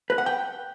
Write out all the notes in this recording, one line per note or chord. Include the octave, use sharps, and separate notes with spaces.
B4
F#5
G5